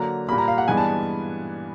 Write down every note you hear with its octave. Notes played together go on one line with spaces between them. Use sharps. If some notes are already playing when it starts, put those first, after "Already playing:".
Already playing: D3 F#3 A#3 A#5
A#2 G3 A#3 B5
A#5
F5
F#5
G2 E3 G#3 B3 D4 G#5
A5